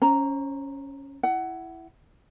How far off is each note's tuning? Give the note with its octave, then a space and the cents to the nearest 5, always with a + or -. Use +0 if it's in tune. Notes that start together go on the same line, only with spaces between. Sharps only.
C#4 +0 C5 +40 A#5 +0
E4 +10 F#5 +20